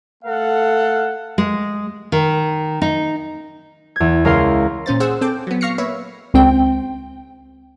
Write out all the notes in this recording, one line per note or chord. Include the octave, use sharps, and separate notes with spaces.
A3 A4 F5 F#5
G#3
D#3
D#4
E2 G#6
C#2 A#4 F5 C6
A#2 C#4 C5 A6
G#4 C5 F#5 E6
C4 A4 G5 D6
F#3 B3
F5 C#6 F6 A#6 C7 C#7
A#3 B4 C#5 E5
C#2 C4 G5